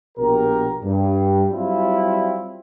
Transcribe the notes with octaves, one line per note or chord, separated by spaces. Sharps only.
A#1 B2 G4 A#4
G2
F#3 G3 C4 E4 F4